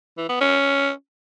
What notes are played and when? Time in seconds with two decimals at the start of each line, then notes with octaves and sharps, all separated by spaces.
0.17 E3
0.29 B3
0.41 C#4